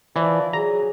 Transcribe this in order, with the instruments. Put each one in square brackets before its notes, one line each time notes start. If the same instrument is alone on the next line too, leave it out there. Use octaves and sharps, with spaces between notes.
[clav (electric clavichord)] E3 [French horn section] F3 D5
[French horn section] F#3 G#4 [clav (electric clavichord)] A#5